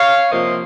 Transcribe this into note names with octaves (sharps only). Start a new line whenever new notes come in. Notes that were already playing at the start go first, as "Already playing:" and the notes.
Already playing: C#5 F5
C3 F3 A#3 C5 D#5